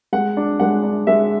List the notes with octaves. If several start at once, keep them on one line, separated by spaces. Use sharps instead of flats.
G#3 F#5
D4
G#3 F#5
D4
G#3 E5